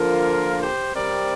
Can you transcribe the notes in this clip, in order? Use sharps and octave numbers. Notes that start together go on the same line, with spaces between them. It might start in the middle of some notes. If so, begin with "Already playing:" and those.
Already playing: D3 F3 A#3 F4 A#4
G4 C5
C3 G3 C4 A#4 D5